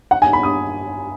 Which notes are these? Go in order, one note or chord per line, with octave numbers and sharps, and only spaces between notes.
F#5
G#5
B5
D#6